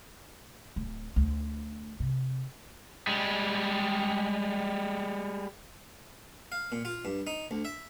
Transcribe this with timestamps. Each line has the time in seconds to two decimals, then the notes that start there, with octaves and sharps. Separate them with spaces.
0.76 D1
1.16 D2
2.00 C3
3.07 G3 G#3
6.52 F5
6.72 A#2
6.85 F4
7.05 G2
7.27 D#4
7.51 D2
7.65 E5